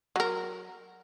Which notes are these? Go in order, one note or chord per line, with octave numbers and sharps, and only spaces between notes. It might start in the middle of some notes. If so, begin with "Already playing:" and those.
F#3 A#4